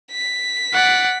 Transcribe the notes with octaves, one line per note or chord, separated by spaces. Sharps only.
B6
D5 F#5